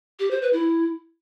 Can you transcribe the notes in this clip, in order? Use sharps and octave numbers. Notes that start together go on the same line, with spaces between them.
G4
C5
B4
E4